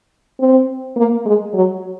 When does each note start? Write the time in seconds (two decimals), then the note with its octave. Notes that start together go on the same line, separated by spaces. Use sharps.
0.40 C4
0.97 A#3
1.25 G#3
1.54 F#3